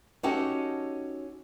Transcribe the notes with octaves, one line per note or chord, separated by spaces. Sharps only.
C#4 D#4 F#4 G4 A4 D#5